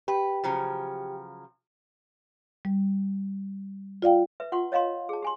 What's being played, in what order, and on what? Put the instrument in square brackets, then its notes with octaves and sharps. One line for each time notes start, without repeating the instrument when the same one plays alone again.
[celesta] G4 G5 [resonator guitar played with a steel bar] B4
[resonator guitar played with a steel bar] C#3 F3 F#3
[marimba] G3
F4 D5 F5 G5
[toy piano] B4 E5
F4 F#5 C6 C#6
C#5 D#5 F5 A#5 C6
G#4 A5
G4 G#5 C6